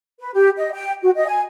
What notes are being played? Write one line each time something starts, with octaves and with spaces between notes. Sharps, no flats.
B4
G4
D#5
G5
F#4
D#5
G#5